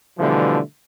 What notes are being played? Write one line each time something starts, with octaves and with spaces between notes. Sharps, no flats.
B2 D3 E3 F3 G3 A3